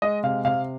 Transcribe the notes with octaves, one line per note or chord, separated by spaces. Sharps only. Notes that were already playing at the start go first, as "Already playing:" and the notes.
G#3 D#5
C3 F5
C3 F5